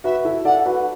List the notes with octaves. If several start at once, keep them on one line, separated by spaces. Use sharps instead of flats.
F#4 B4 E5
E4 A4
A4 D5 F#5
F#4 B4